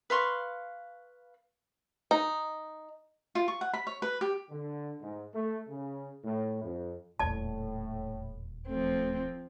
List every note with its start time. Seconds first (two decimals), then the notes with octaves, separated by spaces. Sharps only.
0.10 B4 F5 C6 C#6
2.11 D#4
3.35 F4
3.48 C#6
3.61 F#5
3.73 B5
3.87 C#5
4.02 B4
4.21 G4
4.51 D3
5.02 G#2
5.35 A3
5.69 C#3
6.24 A2
6.62 F2
7.19 D#1 E2 A2 D5 A5
8.68 F3 A3 C4